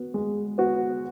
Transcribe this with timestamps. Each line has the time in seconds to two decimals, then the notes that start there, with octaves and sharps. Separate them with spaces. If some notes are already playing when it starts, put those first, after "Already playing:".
Already playing: B3 F#4
0.14 G#3
0.58 B3 F#4